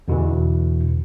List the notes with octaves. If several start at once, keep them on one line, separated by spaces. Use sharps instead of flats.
E2 B2 D3 E3